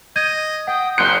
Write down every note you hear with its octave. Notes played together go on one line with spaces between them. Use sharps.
D#5 G6 G#6 D#7
F#5 G5 D#6
F#1 G5 C6 F#6 G6 C#7